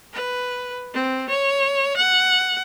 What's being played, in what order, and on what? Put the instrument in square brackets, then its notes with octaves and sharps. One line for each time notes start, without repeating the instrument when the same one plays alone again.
[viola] B4
C4
C#5
F#5